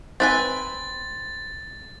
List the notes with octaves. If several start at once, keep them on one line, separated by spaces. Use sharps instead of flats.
C4 B4 G#5 A6